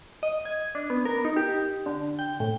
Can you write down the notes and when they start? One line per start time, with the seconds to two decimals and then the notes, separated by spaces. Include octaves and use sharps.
0.23 D#5
0.45 G#6
0.75 D4
0.90 B3
1.05 A#4
1.25 D#4
1.36 G4
1.86 D3
2.19 G5
2.40 A2